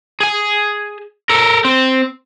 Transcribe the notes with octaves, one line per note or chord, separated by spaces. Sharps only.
G#4 G#5
A4 A#4
C4